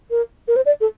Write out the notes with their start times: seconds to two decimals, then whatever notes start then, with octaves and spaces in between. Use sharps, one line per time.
0.11 A#4
0.48 A#4
0.56 C5
0.66 D5
0.81 A4